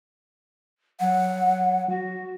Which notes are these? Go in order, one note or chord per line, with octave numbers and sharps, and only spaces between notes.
F#3 F#5
F#4